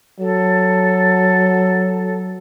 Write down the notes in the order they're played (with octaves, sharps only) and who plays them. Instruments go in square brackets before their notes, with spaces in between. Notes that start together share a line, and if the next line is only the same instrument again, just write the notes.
[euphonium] F#3 [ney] A4